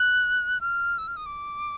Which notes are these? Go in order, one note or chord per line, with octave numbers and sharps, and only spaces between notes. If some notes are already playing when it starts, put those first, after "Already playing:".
Already playing: F#6
F6
E6
F6
D#6
D6